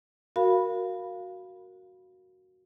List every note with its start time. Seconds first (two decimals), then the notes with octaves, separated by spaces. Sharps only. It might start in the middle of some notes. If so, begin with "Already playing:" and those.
0.36 F#4 A#4 F5 B5